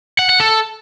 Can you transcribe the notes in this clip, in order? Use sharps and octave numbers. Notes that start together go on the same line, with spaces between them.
F#5
F#5
A4